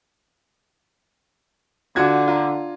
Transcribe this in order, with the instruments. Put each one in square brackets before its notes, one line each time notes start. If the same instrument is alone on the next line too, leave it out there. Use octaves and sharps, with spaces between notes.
[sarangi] D3 [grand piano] F4 F#4 G#6
[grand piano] F4 A#5